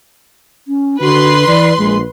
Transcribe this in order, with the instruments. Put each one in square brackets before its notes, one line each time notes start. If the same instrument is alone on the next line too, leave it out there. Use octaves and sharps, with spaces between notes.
[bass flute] C#4
[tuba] D3 [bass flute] F#4 [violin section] B4 C6
[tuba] E3 [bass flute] D5
[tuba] A#1 [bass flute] G#3